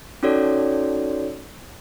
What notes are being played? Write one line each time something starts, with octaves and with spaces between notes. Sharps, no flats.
C#4 D#4 F#4 A4 C#5 D5